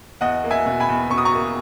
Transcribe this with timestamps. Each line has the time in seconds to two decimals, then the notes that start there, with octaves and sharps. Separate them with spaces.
0.21 E2 D#5 F#5
0.44 A#3
0.50 E5 G#5
0.66 B2
0.80 G#5 B5
0.89 E2
1.10 B2 C#6
1.18 D#6
1.25 A#5 C#6
1.33 A#3